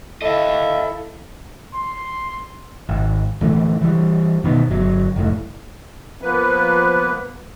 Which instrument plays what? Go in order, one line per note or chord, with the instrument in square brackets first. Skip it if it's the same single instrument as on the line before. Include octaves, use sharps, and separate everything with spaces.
[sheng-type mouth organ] E4 A4 [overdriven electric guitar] D#5 F5
[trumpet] C6
[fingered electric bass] G#1
D1 C#3 E3 A3
E3 G3
B2 D#3 B3
G1 F#3
F1 A2
[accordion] F3 A#3 B3 B4